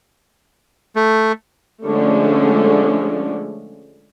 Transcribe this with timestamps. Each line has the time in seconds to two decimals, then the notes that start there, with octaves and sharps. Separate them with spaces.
0.96 A3
1.84 D3 F3 G#3 A3 C#4 D4